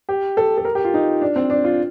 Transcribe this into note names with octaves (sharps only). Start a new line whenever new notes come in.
G4
A4
A4
A#4
G4
F4
D#4
D4
C4
D4
F4